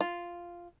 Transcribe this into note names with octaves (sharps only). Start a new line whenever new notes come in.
F4